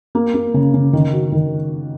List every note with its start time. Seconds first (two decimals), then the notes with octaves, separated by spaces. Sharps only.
0.15 A#3
0.34 A#3
0.54 C#3
0.74 C#3
0.93 D#3
1.13 F#4
1.32 D#3